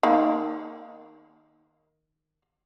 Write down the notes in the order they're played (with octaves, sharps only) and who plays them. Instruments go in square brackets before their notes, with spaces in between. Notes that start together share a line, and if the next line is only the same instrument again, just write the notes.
[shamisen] D#3 A#3